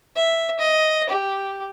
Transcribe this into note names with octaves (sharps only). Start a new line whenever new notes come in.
E5
D#5
G4